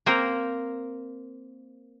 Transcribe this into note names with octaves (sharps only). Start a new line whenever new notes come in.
A#3 C4 A#4 C5